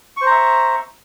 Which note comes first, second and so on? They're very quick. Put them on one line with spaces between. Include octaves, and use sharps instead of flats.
C#6 C5 A#5 E5